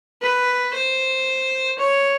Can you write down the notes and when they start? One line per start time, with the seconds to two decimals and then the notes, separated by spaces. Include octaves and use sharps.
0.22 B4
0.74 C5
1.78 C#5